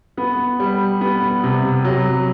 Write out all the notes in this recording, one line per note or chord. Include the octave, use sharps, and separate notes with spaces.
B3
G3
B3
C3
F#3